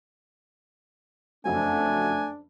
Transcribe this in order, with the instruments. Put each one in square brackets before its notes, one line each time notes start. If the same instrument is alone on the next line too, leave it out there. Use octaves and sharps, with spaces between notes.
[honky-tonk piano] F#1 F2 F#3 [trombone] A3 [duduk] D4 [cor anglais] G#5